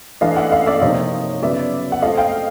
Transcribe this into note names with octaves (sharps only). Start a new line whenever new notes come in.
E3 A3 D4 D#5 F5
E5 F#5
D#5 F5
D5 E5
C3 F3 A#3 D#4 C#5 D#5
C#3 F#3 B3 D5 E5
F#5
A3 C4 F4 A4 D#5 F5
F5 G5